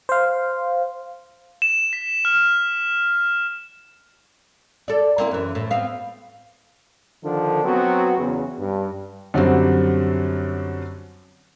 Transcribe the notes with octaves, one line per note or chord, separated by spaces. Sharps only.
C5 F5
E7
B6
F6
A4 D5
A#3 C4 E4
F#2 E3
A2
B3 C4 F5
D3 D#3 F3 D4 A4
F#3 B3 C4 F#4
E2 C#3
G2
F#2 D3 F#3 G3 C4